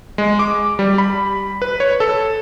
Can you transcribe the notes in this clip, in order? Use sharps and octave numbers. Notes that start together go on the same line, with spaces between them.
G#3
D6
G3
B5
B4
C#5
A4